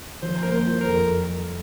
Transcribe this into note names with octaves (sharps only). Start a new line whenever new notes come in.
F3 C5
A#3 A#4
C5
F4
A#4
F2